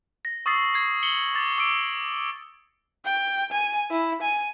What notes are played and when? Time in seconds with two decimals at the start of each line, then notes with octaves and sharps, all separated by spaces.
0.25 A#6
0.46 C#6 D#6 E6 A6 C7
0.74 G#6 C7
1.03 C#7 F#7 G7
1.34 D6 A6
1.58 D6 E6 D7
3.05 G5
3.52 G#5
3.91 E4
4.22 G#5